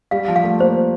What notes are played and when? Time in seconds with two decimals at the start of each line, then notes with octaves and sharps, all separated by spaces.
0.11 G3 F5
0.28 F3
0.36 F5
0.44 A3
0.60 A#3 C5